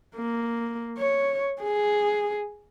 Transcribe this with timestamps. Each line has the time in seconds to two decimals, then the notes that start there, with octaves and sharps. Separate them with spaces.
0.16 A#3
0.98 C#5
1.62 G#4